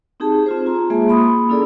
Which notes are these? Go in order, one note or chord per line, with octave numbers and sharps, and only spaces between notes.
C4 D#4 G4 G#4 A5
C4 F4 C5
F4 A#5 C6
G#3 A#3 G#4 E5 A5
A#3 B5 C6 D#6
C#4 E4 G#4 A4 D5